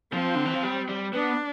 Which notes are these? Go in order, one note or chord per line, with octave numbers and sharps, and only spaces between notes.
F3 C4
D3
E3
F3
G3
G3
B3 D4